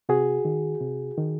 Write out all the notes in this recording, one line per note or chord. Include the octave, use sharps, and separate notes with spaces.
C3 F#4 G#4
D#3
C3
D#3